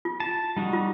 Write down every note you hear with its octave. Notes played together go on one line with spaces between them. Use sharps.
F4
A5
G3 D#4 F#4
F4